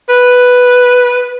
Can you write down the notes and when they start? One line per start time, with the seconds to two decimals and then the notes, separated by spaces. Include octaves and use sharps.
0.09 B4